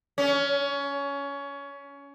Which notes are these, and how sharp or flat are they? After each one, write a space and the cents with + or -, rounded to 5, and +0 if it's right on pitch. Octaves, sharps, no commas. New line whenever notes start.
C#4 +20